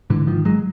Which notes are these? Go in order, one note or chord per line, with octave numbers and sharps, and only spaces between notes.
G#2 D3 E3
D#3 F3
F#3 G#3